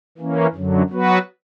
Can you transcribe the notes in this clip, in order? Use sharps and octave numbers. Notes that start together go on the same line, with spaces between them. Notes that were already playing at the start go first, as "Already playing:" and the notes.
E3 A#3 C#4
F#2 D3 F#3
F#3 B3 F#4 B4